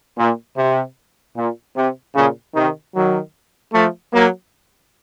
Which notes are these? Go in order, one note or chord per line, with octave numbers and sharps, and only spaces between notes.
A#2
C3
A#2
C3
A#2 C#3
C3 D#3
D#3 F#3
F3 A3
F#3 A#3